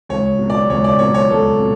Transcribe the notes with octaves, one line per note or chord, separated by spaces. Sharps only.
C#2 C#5
B2 F#3
D5
C#2 C#5
D5
B2 F#3 C#5
C#5
C#2 A4
B2